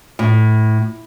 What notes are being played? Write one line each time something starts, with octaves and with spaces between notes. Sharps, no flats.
A2